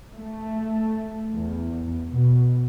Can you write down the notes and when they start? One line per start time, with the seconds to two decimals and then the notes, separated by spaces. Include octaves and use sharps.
0.15 A3
1.33 E2
2.11 B2